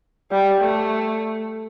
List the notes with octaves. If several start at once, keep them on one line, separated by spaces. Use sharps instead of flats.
G3
A3